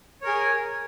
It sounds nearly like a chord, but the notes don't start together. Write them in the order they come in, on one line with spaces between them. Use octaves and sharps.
C#5 A#4 G#4